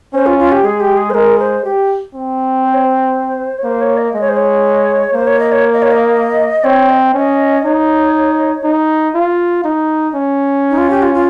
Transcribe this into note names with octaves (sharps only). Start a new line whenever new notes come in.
C#4 C5
F4
F4
G4
G#3 G#4
G4
G#4
C5
G#3 A#4
C5
G4
C4
C5
C#5
C5
C#5
A#3 C5
C#5
D#5
G#3 D#5
C#5
C5
C#5
A#3 C5
C#5
D#5
C#5
D#5
C#5
D#5
C4 C#5
D#5
C#4 D#5
D#4 C#5
D#4
F4
D#4
C#4
D#4
F4
G4
F4
F4